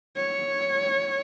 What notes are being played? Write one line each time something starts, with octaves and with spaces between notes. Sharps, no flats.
C#5